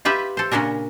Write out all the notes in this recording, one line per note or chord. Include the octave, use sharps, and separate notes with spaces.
F4 G4 B4 E5
A4 C5
A#2 C#3 C#4 D4 A#4